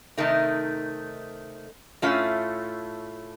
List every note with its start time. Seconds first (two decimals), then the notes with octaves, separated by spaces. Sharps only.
0.17 C3 D#3 A3 D#4
2.02 A2 A3 C#4 F4